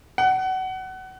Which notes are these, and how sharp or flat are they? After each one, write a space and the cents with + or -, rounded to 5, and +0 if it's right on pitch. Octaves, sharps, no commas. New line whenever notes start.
F#5 +25